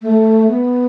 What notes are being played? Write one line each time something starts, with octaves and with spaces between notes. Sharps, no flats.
A3
B3